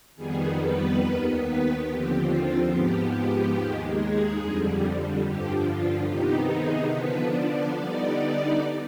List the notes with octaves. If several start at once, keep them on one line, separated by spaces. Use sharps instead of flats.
F2 D#3 G3 B3 G#4
B4
D#2 D#3 B3
B4
D#2 D3 F3 C4 G4
F4
G#2 F3 B3 G4
G4
D#2 D#3 G#3
G#4
F2 D3 G3
G2 D3 F3 G4
F4
C3 D#3 B3 D#4 G4
G#4
D3 F3 B3 D4 B4
D5
D3 G3 B3 D#4 D5